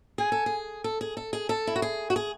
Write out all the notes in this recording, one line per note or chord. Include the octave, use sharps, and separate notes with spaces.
G#4 G#5
A4
G#4
A4
G#4
A4
G#4
A4 A5
E4
F#4
G#4
F#4
G#4